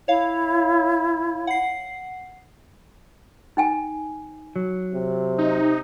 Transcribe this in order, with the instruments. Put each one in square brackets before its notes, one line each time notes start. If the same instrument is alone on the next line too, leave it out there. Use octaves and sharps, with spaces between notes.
[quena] E4 [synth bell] C#5 F5
[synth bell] F#5 C7
[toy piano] D#4 G5 G#5
[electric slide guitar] F#3
[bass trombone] C3
[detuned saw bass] D#4